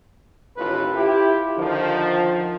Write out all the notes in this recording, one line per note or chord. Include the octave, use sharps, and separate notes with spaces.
A1 D#2 A2 F4 B4
E4 F4 G4
D3 D#3 F3